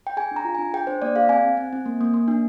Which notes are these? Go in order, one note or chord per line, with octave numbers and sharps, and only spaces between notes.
G5
G#4 G#5
D4
A#5
F4
D4 G#5
G#4 G5
D4 C5
A#3 D5
G#4 F5
C4 G#5
C4
C4
C4
A#3
A#3
A#3
D4